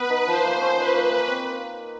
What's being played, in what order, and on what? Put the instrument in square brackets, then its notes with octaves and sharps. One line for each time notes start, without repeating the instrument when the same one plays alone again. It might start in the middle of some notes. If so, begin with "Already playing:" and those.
Already playing: [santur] B3 [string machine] B4
[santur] D#4
[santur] F3 [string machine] C5
[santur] A#3
C#4
[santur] D#4 [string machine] B4
[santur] A#3
A#3
C4